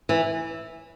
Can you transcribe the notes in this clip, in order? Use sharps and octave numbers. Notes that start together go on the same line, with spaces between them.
E3